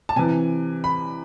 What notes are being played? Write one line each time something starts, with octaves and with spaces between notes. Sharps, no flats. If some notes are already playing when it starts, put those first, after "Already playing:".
A5
C3 E3 G#5
B5